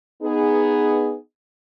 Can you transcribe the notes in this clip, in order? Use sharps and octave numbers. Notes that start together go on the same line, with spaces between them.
B3 D#4 G#4